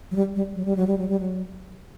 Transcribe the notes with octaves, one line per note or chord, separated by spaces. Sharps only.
F#3
G3
G3
F#3
G3
F#3
G3
F#3
G3
F#3